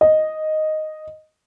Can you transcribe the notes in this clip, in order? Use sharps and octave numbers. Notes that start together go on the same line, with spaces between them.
D#5